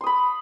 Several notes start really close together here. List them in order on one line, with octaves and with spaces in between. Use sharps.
C6 D#6 B5